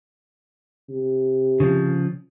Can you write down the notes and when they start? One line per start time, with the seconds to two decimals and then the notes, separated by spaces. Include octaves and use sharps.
0.90 C3
1.60 C#3 F3